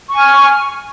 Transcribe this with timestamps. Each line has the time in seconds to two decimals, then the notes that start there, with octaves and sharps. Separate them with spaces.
0.10 C#6
0.15 G#5
0.19 F6